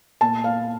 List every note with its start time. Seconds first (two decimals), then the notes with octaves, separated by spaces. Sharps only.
0.21 A#2 A5
0.44 F5